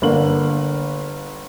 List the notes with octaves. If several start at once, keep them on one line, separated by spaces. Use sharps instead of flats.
G1 D3 A#3 F#7